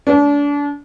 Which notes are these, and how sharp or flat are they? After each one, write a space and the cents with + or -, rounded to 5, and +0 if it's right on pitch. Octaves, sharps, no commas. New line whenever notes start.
D4 -30